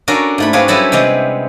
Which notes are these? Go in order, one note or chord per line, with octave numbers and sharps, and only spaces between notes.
C#4 D4 F#4 A4 A#4
G#2 A3 B5
C4 D4 G#4 B4 C#5 F5
F#3 G3 C#4 E4 A4 B4
C3 G3 G#3 B3